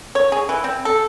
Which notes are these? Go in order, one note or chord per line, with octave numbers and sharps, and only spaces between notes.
C#5
G#4
E3
C4
A4